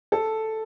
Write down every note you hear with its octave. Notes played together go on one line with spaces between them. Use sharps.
A4